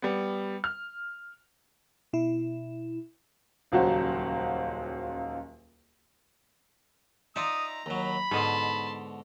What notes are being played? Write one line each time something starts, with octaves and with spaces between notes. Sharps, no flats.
G3 B3
F6
B2 E4
D#1 C#2 F#3 F#4 C5
D#4 F4 D5 E5 A#5 D#6
D#2 F#3 B5
G#2 B2 D3 D#5 A5 C6